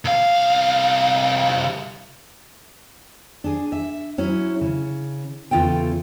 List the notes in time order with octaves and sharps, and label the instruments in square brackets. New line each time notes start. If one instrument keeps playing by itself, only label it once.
[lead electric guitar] C2 F5
[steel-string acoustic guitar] D4 G#4
E5
F#3 C#4 E4
C#3
E2 C#3 F4 A4 G5